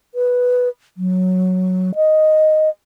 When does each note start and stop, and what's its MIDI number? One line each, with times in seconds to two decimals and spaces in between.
0.15 0.68 71
0.97 1.91 54
1.95 2.69 75